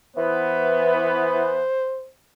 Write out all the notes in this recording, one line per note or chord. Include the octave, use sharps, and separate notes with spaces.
E3 B3 C5